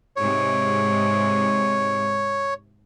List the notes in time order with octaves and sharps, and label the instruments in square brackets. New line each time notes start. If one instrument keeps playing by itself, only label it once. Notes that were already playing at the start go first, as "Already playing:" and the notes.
[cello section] G#2 C3 G#3 [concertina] C#5